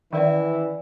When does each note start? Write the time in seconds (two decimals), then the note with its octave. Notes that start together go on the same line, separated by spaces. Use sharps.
0.13 D#3 E3 C#4 E4 D5 E5